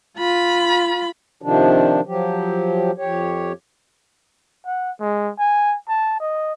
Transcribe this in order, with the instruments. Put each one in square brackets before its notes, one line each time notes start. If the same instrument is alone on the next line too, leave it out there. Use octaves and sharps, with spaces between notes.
[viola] F4 B5
[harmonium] C3 D#3 F3 D4
F3 F#3 G4
F2 G4 C#5
[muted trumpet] F#5
G#3
G#5
A5
D#5